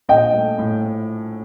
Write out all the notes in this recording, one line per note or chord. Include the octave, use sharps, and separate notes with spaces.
A#1 D#5 G5
A3
A2